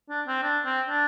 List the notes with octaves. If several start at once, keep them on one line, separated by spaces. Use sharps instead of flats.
D4
C4
D4
C4
D4